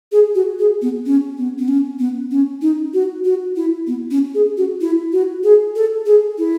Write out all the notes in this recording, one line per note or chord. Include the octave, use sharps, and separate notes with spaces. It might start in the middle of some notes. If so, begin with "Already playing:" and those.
G#4
F#4
G#4
B3
C#4
B3
B3
C#4
B3
C#4
D#4
F#4
F#4
E4
B3
C#4
G#4
F#4
E4
F#4
G#4
A4
G#4
E4